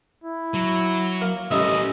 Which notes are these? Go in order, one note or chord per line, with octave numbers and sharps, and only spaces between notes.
E4
F#3
A#3
A1 G3 C#4 E4 D#5 E5